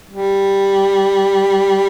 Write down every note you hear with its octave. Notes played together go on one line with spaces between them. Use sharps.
G3